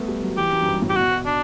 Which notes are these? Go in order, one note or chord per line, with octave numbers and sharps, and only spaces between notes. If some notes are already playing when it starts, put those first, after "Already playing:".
Already playing: A3 B3
G3
F#3
E3 G4
F#2
F#2
G2
A2
G4
B2 F#4
D4